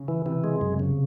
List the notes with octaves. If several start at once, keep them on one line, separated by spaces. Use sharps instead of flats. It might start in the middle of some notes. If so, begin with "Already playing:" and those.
Already playing: C#3 C#4
E3
C3 E3 C4
G#3
F#2
C#3